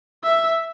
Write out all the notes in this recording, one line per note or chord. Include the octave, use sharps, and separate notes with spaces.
E5